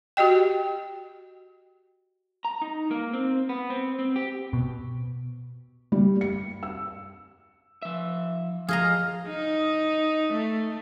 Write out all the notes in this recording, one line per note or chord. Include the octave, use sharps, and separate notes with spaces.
F#4 G4 D#5 G5
A#5
D#4
A#3
C4
B3
C4
C4
G4
B2
G3
C#7
E6
F3 E5
F3 G#4 D#5 F5 A#5
D#4
A3